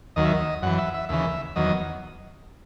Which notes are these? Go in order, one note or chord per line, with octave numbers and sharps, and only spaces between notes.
D#2 D#3 F#3 D#5
E5
D#5
F#2 E3 F#5
E5
E5
D#2 C#3 E3 E5
E2 D#3 F#3 D#5